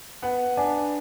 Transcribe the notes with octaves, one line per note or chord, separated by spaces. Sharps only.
B3 F#5
D4 G#5